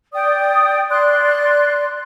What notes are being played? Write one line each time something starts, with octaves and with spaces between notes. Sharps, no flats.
D5 G5 D#6
D5 C6 F#6